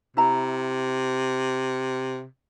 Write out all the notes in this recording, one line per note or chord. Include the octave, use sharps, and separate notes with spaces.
C3 E4 A#5